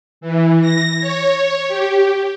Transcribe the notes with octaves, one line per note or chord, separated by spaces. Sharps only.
E3
A#6
C#5
G4